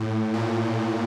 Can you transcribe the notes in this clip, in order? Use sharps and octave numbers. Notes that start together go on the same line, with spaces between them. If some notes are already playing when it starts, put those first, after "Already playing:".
Already playing: A2
A#2